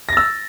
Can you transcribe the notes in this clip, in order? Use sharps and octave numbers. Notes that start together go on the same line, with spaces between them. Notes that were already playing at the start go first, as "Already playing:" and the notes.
E6 A6 A#6